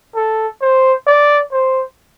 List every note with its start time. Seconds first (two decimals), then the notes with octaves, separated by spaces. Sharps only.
0.15 A4
0.61 C5
1.07 D5
1.52 C5